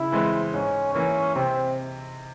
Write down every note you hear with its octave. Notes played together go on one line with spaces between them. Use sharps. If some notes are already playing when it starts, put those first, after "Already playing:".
Already playing: C#3 E4
E3 G#3 C4
G#2 C#4
E3 A#3 C#4
C3 C4